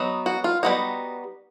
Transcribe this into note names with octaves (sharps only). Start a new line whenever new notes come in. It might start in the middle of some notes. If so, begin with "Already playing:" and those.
Already playing: F#3 B3 D#4
F#4
F4
G3 B3 D#4 F#4